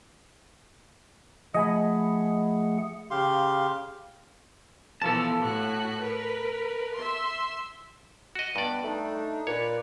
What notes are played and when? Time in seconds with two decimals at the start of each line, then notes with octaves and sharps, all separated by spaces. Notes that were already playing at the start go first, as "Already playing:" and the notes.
1.54 F3 A3 G#4 D#5 F#5 G#5 B5
3.11 C#3 G4 F5 C6
5.02 B2 E3 F3 A4 A5
5.42 A2 F#4 F#6
6.02 A#4 B4
6.95 E5 C6
8.35 F#4 D#5
8.56 G2 B2 B4 D5
8.83 A3 D4 D#4
9.47 A#2 B4 C#5 D5